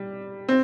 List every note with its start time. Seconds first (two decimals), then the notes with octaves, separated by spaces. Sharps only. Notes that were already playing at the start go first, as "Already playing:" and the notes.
Already playing: G3
0.49 C4